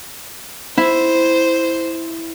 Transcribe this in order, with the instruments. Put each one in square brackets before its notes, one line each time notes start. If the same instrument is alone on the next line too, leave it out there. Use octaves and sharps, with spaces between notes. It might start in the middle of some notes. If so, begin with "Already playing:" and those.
[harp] E4 [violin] C5